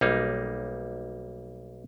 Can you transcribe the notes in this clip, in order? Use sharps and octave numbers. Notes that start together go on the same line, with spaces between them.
B1 G3 A#3 D#4